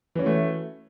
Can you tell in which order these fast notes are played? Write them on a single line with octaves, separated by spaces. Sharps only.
E3 C#4 F#4 A3